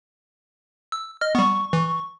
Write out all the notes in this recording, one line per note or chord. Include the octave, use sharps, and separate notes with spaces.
E6
D#5 F6
G3 B3 C#6
E3